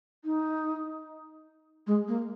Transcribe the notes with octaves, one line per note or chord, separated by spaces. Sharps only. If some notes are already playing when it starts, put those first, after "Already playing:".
D#4
G#3
A#3